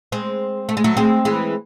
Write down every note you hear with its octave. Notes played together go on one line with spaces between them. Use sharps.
G#3 C4
A3
G#3
F#3 A3
G#3 C4
E3 G#3